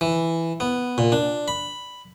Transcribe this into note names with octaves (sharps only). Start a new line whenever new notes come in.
E3
B3
A#2
D4
B5